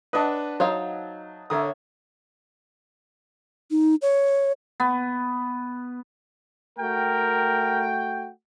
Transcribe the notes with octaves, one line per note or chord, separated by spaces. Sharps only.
D4 B4 D#5 F#5 A5
F#3 D#4 C5 C#5 F5
D3 A#4 C#5 E5 D#6
D#4
C#5
B3
A3 F#4 A#4 G5